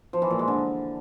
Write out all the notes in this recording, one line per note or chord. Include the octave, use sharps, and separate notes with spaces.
F3
E3
A#2
G#3
D3